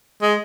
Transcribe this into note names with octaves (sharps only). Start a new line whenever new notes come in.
G#3